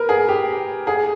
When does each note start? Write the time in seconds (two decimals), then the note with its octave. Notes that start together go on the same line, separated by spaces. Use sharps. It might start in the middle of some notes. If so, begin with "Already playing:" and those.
Already playing: A#4 B4
0.09 G#4
0.28 G4
0.87 G#4